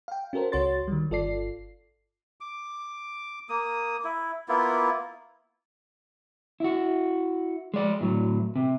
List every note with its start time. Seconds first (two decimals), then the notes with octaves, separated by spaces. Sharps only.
0.08 F5 G5
0.33 C#4 F#4 A4 A#4 C5
0.52 C#2 F#4 C#5 C6 A6
0.88 D#3 G3
1.10 G1 F4 A4 D5 C7
2.41 D6
3.49 A#3 D#6
4.04 E4
4.48 A#3 B3 E4 F4
6.60 E4 F#4
7.74 G#3 D5
8.01 A2 F#3
8.56 C3